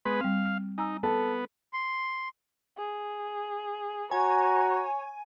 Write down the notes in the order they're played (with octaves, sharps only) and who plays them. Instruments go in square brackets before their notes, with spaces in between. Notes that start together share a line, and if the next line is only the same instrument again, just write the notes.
[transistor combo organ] G#3 B3 B4 [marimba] C6
[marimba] G3 C4 [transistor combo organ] F5
[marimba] F6
[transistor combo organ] D#4 [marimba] G#5 A#5 E6
[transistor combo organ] B3 [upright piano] A4 A5
[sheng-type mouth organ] C6
[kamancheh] G#4
[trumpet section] F#4 A#5 [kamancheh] C#5 [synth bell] G#5